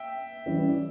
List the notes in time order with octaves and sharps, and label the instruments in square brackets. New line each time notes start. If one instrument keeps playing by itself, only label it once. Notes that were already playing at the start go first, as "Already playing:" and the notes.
Already playing: [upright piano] E5 G5
[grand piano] E3 G3 C#4 E4